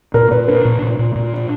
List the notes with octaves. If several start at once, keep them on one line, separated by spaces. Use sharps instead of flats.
A#2 A#4
A#2 B4
D4 A#4
A#2
A#2
A#2
A#2
D4